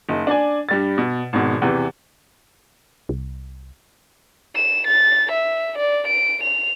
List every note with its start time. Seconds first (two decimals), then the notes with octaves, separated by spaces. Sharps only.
0.09 F#1 D#4
0.27 D4 D5 G#5
0.69 G2 G3 A6
0.98 B2
1.33 G#1 G#2 B2
1.62 E2 C3 E3
3.09 C2
4.55 E7
4.87 A6
5.31 E5
5.78 D5
6.07 D7
6.43 F7